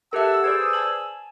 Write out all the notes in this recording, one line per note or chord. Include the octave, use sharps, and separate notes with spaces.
G4 A4 A#4 E5 F#5 A5 E6
G#4 B4 C5 D5 G#6
G#5 A5 G#6 F#7